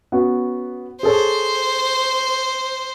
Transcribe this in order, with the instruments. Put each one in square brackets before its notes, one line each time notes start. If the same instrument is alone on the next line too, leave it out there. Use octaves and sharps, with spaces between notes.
[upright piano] B3 C#4 F#4
[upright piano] G#4 A4 C#5 [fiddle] C5